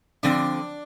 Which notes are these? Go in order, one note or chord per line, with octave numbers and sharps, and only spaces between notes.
D3 F3 C4 D4